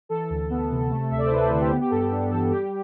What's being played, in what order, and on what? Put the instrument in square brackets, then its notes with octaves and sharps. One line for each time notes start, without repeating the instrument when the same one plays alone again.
[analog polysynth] E3 A4
D2
B3
C3
A3
D2 E5
D5
C5
E4 B4
A4
D3 A4
G4
B3 G4
G4
G2 A4
G4
D4
E3 A4
G3 G4